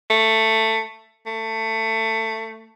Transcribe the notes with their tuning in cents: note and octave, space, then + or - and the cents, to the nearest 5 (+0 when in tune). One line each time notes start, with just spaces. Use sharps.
A3 +10
A3 +20